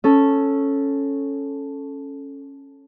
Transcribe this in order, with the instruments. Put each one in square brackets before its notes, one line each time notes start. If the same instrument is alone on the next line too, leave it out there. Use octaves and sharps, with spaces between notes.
[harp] C#4 A4